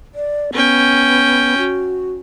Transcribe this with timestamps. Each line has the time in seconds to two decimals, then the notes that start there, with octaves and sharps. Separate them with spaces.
0.15 D5
0.53 B3 C#4 G5
1.58 F#4